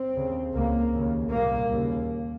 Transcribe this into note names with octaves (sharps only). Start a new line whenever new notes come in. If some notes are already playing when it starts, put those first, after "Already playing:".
Already playing: C4
D#2 C#3
C#2 C#3 A#3
D#2 C#3
C2 A#2 A#3
D#2 C#3